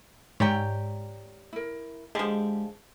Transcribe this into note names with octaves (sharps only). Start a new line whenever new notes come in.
G#2 G4 C#5 D5 G5 A#5
E4 A#4
D3 F3 G#3 G4